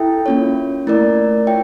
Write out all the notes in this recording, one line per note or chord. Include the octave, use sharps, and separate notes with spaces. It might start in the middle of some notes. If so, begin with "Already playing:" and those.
Already playing: E4 A4 E5 G5
A#3 C#4 F4 C#5
A3 E4 A#4 D5
F4 C#5 E5 G5